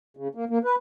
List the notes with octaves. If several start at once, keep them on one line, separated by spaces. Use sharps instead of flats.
C#3
A#3
A#3
B4